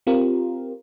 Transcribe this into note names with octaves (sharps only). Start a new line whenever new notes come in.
C4 F4 G4 A#4